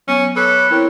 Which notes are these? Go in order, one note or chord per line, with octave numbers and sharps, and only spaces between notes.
F#3 B3 C#4
A4 B4 C#5 B5 D6
C4 E4 A#4 C#5